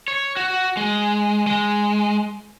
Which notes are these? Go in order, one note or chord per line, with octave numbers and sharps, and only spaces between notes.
C#5
F#4
G#3
G#3